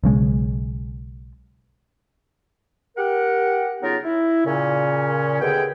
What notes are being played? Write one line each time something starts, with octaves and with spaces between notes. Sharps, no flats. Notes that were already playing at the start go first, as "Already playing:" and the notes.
B1 C#3 G#3
G4 A#4 F#5
C#3 F#3 B3 D#4 F4 A#4
E4
A#2 C#3 C#4
D#2 B2 D3 G#4 G5